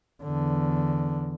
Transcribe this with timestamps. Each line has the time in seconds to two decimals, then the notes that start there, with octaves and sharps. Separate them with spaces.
0.22 E2 D3